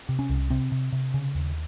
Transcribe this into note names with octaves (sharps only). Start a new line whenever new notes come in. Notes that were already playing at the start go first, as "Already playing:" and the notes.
C3
C#4
C2
C3 C4
C3
C3
C#3
D#2